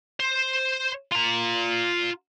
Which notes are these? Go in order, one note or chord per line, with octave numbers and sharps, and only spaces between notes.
C5
F4 A#5